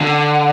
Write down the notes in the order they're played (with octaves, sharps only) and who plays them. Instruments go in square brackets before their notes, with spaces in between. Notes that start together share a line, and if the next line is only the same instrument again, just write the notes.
[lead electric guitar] D3